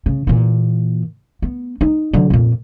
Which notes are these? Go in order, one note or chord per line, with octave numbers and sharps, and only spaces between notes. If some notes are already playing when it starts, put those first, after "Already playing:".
C#3
A#2 E3
B3
D#4
D3 F#3
F2 A#2